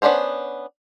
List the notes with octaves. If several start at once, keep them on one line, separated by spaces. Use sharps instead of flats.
B3 C#4 D4 A#4 C5